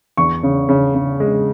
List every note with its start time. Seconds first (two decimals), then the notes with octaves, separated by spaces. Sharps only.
0.17 E2 C#6
0.43 C#3
0.69 C#3
0.95 C#3
1.20 G#3